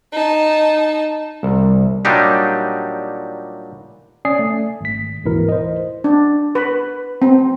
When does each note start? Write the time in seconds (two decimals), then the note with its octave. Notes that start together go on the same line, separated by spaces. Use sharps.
0.12 D#4 A5
1.43 C2
2.05 A#2 F#3 G3 D4 D#4 G4
4.25 C#4 D5 G#5 D#6 C7
4.39 A3
4.81 G#1 B6
5.24 D2 G#2 B2 E3 E4 A#4
5.49 C5 D#5
6.04 D4
6.55 B4
7.22 C4